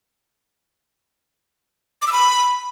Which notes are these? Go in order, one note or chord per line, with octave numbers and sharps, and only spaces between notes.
D6
E6
B5